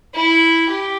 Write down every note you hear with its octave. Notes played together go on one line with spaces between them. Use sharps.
E4
G4